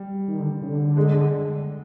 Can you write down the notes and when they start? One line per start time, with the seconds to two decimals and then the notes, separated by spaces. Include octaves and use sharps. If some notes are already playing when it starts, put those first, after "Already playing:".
Already playing: G3
0.28 D#3
0.40 D3
0.62 C#3
0.68 D3
0.97 G#3